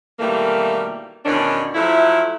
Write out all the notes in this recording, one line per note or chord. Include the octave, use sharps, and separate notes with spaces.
B2 D#3 E3 G3 A3 A#3
E2 B2 D#3 C#4 D4
F3 F#3 A3 E4